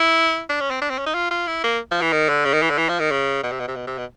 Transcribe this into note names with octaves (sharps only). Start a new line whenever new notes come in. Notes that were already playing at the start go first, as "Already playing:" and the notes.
Already playing: E4
D4
C#4
C4
D4
C4
C#4
D#4
F4
F4
E4
A#3
F3
E3
D#3
D3
C#3
D#3
E3
D3
E3
F3
D#3
C#3
B2
C3
B2
C3
B2
C3
B2